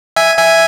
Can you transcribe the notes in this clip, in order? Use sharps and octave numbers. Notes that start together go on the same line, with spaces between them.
E5 G#5
E5 G#5